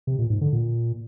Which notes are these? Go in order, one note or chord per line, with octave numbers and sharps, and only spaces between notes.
C3
A#2
G#2
D3
A#2